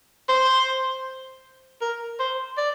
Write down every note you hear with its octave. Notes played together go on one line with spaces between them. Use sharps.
C5
A#4
C5
D5